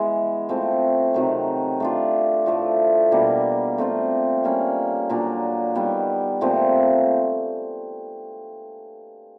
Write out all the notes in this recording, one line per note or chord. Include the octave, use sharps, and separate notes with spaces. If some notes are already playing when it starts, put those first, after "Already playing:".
Already playing: E3 G#3 B3
F3 A3 C4
C3 D#3 F#3
A3 D4 F4
A2 F3 A3
B2 G3 A#3 D4
A3 C4 F4
G3 A#3 C#4
A#2 F#3 A#3 D4
D#3 G3 B3
A#2 F3 A3 C4